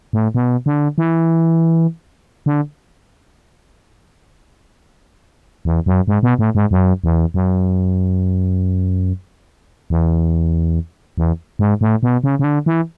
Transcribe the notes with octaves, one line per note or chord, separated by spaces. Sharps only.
A2
B2
D3
E3
D3
E2
F#2
G#2
B2
A2
G#2
F#2
E2
F#2
E2
E2
G#2
A2
B2
C#3
C#3
D3
E3